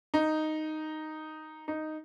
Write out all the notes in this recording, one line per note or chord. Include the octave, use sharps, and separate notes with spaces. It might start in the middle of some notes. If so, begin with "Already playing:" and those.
D#4
D#4